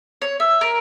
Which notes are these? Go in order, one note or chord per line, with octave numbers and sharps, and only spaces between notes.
C#5
E5
A#4